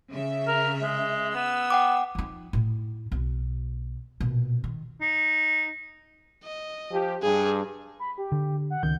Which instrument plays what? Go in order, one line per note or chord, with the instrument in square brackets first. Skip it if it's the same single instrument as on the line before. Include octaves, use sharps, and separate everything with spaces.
[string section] C#3 E5
[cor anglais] A#4
G#3
[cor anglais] B3 [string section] E6
[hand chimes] F#5 G5 D6
[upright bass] F3 D#4
A2 E4
B1
A#1 B2
D#3
[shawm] D#4
[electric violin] D#5
[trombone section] F3 G4
[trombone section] G2 [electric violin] G#4
[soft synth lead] B5
G4
[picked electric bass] D3
[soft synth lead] F#5
[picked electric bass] C#2 D#3 [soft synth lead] G6